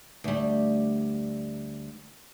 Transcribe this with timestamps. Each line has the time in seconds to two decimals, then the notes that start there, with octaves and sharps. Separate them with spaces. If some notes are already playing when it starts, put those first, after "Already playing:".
0.24 D2 G3